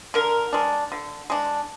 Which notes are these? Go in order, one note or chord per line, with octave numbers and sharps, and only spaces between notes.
D3 A#4
G#3 D4
D3
G#3 D4